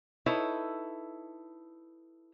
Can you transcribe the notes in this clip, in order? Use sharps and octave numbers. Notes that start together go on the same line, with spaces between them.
D#4 E4 A4 B4 C#5